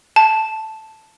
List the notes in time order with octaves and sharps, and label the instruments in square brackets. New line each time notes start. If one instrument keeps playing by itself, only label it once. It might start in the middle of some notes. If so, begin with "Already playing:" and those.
[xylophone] A5